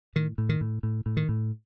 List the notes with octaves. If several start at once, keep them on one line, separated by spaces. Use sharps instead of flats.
A2 D#3
A2
D#3
A2
A2
A2
D#3
A2